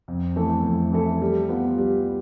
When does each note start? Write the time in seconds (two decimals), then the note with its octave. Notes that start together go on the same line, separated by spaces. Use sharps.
0.08 F2
0.36 E3 A3 E4 A4
0.65 F2
0.92 E3 A3 E4 A4
1.22 G3
1.49 B3 F4
1.78 G3